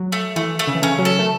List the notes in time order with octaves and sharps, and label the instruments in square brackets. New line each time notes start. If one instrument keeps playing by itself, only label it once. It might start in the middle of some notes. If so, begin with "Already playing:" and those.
Already playing: [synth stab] F#3
[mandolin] A3
[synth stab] E3 [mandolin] A3
[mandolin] A3
[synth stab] C#3
E3
[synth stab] C#3 [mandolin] C#4
[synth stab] F#3
[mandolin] A4
[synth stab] A3